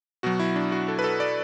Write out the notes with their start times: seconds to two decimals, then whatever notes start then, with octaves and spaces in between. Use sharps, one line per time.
0.23 B2 F#3 F#4
0.39 E4
0.56 D4
0.72 F#4
0.88 A4
0.99 B4
1.04 A4
1.20 D5